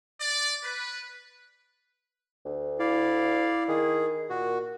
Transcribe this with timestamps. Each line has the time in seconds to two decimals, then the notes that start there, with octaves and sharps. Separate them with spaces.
0.21 D5
0.63 B4
2.46 D2
2.80 E4 D5 F5
3.69 D#3 G#4
4.30 A#2 F#4